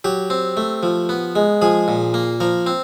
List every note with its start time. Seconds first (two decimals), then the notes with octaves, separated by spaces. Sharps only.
0.04 F#3 G4
0.30 C4
0.57 A3
0.83 F3
1.09 B3
1.36 G#3
1.62 F3 G#4
1.88 A#2
2.14 A#3
2.40 F3 A#4
2.66 C4